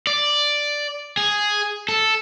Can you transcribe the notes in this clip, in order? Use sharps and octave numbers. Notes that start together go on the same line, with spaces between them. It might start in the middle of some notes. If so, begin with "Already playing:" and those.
D5
G#4
A4